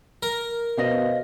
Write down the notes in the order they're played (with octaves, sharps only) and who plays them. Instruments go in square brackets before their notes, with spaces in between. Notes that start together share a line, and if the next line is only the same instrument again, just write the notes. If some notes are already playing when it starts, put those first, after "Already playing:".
[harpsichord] A#4
[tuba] B2 [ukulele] C5 D#5 F5